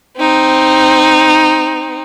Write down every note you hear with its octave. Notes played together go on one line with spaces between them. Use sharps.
C4 D#4